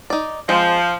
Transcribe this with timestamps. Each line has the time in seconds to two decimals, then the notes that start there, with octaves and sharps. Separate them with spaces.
0.10 D#4 D5
0.49 F3 G#3 C4